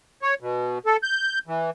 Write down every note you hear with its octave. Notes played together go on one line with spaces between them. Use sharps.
C#5
B2
A4
G6
E3